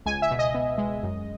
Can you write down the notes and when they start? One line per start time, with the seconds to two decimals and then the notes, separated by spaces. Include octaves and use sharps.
0.06 C#2 G#5
0.22 E5
0.31 B2
0.39 D#5
0.54 B3
0.78 G#3
1.03 F#2